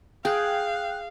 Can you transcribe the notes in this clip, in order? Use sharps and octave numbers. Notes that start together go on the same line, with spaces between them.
G#4 F5 G5 F#6